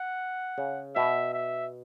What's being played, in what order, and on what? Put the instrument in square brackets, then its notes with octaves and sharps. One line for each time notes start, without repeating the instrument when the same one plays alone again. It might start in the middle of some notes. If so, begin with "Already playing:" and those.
Already playing: [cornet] F#5
[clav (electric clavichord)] C#3
[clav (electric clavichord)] B2 [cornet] E5
[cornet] E5